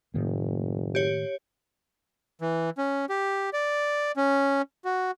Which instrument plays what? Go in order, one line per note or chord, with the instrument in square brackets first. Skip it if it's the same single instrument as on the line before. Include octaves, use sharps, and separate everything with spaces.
[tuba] F#1 [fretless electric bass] A2 D#3 A#3
[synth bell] G4 C#5
[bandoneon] E3
C#4
G4
D5
C#4
F#4